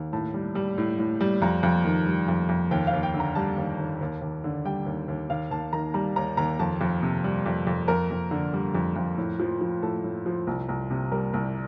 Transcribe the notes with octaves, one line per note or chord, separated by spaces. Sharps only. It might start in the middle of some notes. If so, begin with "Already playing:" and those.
Already playing: D#2
A2 A5
G3
G3
A2
A2
G3
F2 A#5
F2
D#3
G3
F2
F2
D#2 G5
F5
D#2
G5
D3
A#5
G3 A5
D#2
D#2
D#2
D#2
D3
G3 G5
D#2
D#2
D#2 F5
D#2 A5
D#3 A#5
G3 A#5
D#2 A#5
D#2 A#5
F2 A5
F2
C3
G3
F2
F2
F2 A#4
F2
D3
G3
F2
F2
A2
F3
F3
A2 A4
A2
F3
C2
C2
C3
G3 A#4
C2